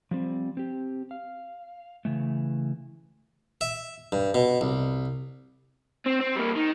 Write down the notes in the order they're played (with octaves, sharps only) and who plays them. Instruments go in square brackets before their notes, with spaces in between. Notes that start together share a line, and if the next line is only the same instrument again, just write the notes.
[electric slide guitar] F3 G3 C4
C4 G4
F5
C#3 E3 A3
[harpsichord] E5
G2
B2
C2
[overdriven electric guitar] C4
C4
G3 A#3
D#3